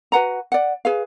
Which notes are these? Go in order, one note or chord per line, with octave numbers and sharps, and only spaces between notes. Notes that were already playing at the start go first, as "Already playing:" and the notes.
F#4 B4 F#5 A#5
D5 F#5
G#4 B4 F5